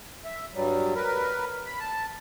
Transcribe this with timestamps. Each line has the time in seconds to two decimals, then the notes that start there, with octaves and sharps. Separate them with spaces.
0.25 E5
0.55 G2 F#3 G3
0.95 A#4 B4
1.66 B5
1.80 A5